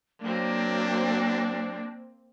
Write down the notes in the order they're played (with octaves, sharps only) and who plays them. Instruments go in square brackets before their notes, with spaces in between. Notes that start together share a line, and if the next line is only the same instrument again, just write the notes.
[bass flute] F#3 [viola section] A#3 C4 [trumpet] D4